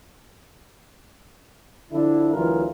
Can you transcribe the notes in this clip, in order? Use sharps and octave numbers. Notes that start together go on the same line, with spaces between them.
D3 F3 D4 E4
D2 E3 F#3 F4 A#4